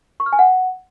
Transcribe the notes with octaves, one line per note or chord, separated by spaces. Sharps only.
C#6
F6
G#5
F#5